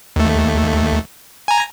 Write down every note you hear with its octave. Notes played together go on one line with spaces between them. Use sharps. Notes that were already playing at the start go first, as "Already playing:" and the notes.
D#2 A3
G#5 A#5